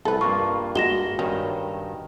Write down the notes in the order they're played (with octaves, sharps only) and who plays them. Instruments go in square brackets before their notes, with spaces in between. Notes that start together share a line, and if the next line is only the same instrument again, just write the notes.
[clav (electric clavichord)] C2 [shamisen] A4 B4
[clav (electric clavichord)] G2 A#3 F4 [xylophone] C#6
[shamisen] G#3 [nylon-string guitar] F#4 [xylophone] A#6 E7 G7
[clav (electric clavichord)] G2 D#3 [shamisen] C#4